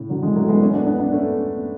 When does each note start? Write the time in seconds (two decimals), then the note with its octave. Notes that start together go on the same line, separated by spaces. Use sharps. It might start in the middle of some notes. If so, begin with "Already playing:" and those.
Already playing: A2 C#3
0.09 D3 F#3
0.22 E3 G#3
0.36 F#3 A3
0.48 G#3 B3
0.61 A3 C#4
0.74 B3 D4
0.87 B3 D4
0.99 B3 D4
1.13 A3 C#4